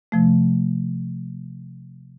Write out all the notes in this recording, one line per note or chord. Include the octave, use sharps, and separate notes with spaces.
C3 F3 A3